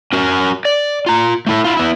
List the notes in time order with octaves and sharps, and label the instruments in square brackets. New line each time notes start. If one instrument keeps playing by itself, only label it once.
[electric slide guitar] C#4 F#4 A#4
D5
F4 A#5
A3 E4 A4
E4 F4
B3 E4